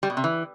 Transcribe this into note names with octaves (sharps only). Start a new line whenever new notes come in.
G3
B2
C3
E3